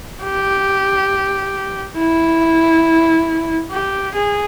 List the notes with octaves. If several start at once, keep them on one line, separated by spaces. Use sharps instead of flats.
G4
E4
G4
G#4